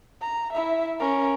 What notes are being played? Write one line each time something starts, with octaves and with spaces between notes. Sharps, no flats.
A#5
E4 E5
C#4 A#4